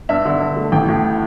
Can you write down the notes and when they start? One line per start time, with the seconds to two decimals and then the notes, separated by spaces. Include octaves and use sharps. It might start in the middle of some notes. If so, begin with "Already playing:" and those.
0.09 G2 E5
0.25 D3
0.41 G2
0.56 A3
0.72 A1 G5
0.88 A2